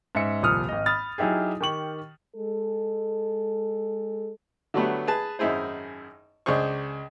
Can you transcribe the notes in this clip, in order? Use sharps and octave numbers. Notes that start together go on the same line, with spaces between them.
G#2 C#4 E5 C#7
D#1 C2 F3 D#6 F6
G#1 D#5
B5 D#6 F6 A6
F#3 D#4 E4 G4 G#4
D#3 G4 C#6 F#7
G#3 A4
D3 F#3 G3 A3 B3
G#4 B4 A5
G#1 F#2 D#4 E4 G#4 C5
C#2 D4 G#4 C5 C#6